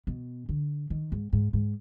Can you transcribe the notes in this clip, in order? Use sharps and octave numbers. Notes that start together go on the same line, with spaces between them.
B2
D3
D#3
G#2
G#2
G#2